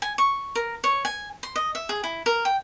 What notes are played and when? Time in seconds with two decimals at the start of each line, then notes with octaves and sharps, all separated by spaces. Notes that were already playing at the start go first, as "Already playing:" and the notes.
0.02 G#5
0.18 C#6
0.55 A#4
0.84 C#5
1.05 G#5
1.43 C6
1.56 D#5
1.75 E5
1.89 G#4
2.04 E4
2.26 A#4
2.45 G5